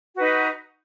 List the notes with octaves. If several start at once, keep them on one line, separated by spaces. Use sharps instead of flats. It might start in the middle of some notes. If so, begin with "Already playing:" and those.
D#4 F#4 B4